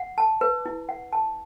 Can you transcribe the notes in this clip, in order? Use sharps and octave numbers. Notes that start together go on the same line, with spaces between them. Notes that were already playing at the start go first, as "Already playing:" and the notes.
Already playing: F#5
A5
B4
E4
F#5
A5